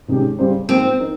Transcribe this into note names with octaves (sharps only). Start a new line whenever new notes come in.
C3 D#3 G#3 C#4 G4
C#3 G3 C4 G4 C5
G#2 F3 A#3 C4
D#4 A#4